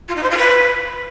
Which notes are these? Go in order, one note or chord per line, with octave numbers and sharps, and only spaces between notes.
F4
D#4
C5
F4
B4